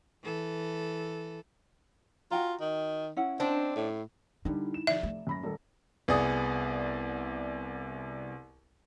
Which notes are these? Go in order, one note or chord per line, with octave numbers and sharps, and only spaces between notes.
E3 A4
F4 F#4 G5 A#5
D#3
C#4 E4 F#5
C4 D4 C5 D#5
A2
D3 G3 D#4 E4
E7
F1 D5 E5
A3
F#2 B5 A#6
D#1 A4
C2 B3 G#4 D5 D#6